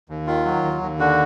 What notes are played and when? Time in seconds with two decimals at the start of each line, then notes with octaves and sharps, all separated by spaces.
0.09 D#2
0.27 D#3 F4
0.45 F#3
0.63 D#2
0.82 D#2
0.99 D3 F#4